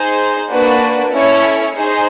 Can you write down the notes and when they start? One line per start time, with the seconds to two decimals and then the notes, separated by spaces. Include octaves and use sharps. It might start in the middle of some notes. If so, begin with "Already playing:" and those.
Already playing: D#4 G#4 C5
0.50 A#3 D4 F#4 B4
1.13 C#4 E4 A4 C#5
1.75 D#4 G#4 C5